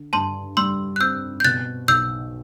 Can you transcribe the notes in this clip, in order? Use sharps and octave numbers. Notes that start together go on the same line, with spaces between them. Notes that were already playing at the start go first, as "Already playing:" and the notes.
Already playing: D3
G2 A5 C6
G3 C6 E6
F#6
C4 E6 G6
G6
B2 F#6 A6
B1 E6 G6